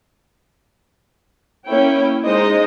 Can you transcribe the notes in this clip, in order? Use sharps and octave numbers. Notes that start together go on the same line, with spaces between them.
A#3 C#4 E4 C#5 G5
G#3 D#4 C5 D#5